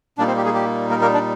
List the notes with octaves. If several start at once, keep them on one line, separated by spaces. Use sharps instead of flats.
A#2 G3 A#3 D4 D#4 D5
C4 C5
G4
G#3 G#4
G4
A#3 A#4
A#3 A#4
D4 D5